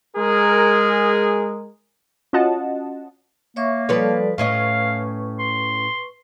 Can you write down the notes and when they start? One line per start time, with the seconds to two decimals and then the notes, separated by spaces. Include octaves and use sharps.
0.17 G#3 G#4 A#4
2.33 C#4 F4 F#4 D#5 F#5 A5
3.56 A#3 C#5 E5 C#6
3.89 F3 G3 A4 B4 C#5 D5
4.38 A2 C#4 B4 D#5 F5 C#6
5.39 C6